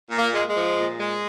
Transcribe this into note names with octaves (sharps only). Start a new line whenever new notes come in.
A#2
A#3
G#3
G#3
F3
A#2
G#3